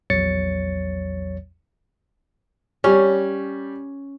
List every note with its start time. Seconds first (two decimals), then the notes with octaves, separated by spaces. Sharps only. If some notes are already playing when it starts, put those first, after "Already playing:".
0.10 A#1 E2 F#3 C#5 A6 C#7
2.84 G3 C#4